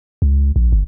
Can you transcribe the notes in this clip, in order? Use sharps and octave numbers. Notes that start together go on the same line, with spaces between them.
C#2
A#1
G1